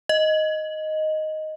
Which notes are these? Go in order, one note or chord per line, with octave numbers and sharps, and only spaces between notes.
D#5